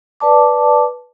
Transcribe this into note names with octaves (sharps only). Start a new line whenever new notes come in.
B4 D5 A5 D6